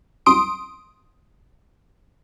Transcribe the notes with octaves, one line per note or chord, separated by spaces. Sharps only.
C2 F#2 C6 D#6 D7